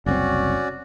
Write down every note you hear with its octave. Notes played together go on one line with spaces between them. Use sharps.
F#1 C2 C4 C#4 F#4 D5